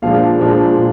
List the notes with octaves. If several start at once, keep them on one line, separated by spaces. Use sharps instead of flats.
A#2 F3 G#3 D4 F5
A#2 F3 G#3 D4
A#2 F3